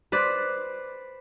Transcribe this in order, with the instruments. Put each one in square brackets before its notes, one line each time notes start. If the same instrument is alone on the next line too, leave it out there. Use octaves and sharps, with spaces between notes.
[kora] B4 C5 D5